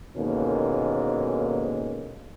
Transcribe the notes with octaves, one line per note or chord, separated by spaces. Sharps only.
D#2 G#2 B2 D3 A#3 C#4